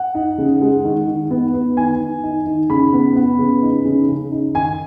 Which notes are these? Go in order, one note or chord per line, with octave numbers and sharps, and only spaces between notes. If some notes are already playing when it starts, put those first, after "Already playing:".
Already playing: F#5
D#4
C#3
G#3
D#3
D#3
B3
B3
D#3 G#5
D#3
D#4
D#3
C#3 B5
B3
B3
C#3
D#4
C#3
C#3
D#4
D#3 G#5